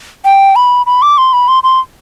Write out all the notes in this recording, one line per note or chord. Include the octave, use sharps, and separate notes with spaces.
G5
B5
B5
D6
C6
B5
C6
C6